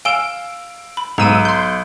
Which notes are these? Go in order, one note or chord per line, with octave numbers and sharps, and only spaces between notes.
F5 G#5 E6 D7 E7 G7
B5
B1 G#2 A#5 E6 D#7
C6 G6